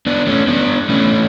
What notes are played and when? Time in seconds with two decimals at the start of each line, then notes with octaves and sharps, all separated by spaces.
0.06 B3 D4
0.27 A3 C#4
0.47 B3 D4
0.89 A3 C#4